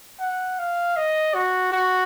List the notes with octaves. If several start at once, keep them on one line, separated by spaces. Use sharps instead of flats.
F#5
F5
D#5
F#4
F#4